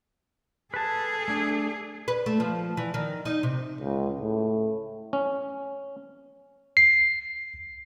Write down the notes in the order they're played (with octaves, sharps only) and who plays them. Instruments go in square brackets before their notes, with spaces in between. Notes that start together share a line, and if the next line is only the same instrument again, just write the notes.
[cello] G#4 A4 [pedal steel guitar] B4 A5
[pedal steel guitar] A3 D4
[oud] B4
A3
F3
E3
D#3
D#4
C3
[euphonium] C#2
A2
[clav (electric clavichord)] C#4
[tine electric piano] C7